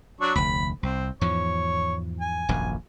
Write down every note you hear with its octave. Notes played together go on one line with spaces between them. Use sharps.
F#3 D4 C#6
F1 D2 B5
C2 C4
E2 G#2 F3 C#5
G#5
D#1 A#1 F#2